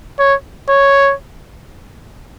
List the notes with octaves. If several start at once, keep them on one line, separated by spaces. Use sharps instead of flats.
C#5
C#5